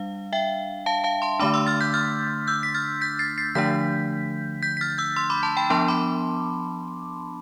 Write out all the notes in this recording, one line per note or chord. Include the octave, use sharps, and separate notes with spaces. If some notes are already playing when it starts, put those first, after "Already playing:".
Already playing: G3 D4 F5
E5 G5
F5 A5
F5 A5
A5 C6
D3 A3 D4 B5 D6
C6 E6
F6 A6
G6 B6
F6 A6
E6 G6
B6
F6 A6
G6 B6
A6 C7
A6 C7
D3 F3 A3 D4 G6 B6
G6 B6
B6
F6 A6
E6 G6
C6 E6
B5 D6
A5 C6
G5 B5
F3 B3 D4 A5 C6
B5 D6